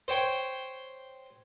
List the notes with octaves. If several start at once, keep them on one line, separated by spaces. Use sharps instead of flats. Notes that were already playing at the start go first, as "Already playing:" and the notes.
C5 C#5 G5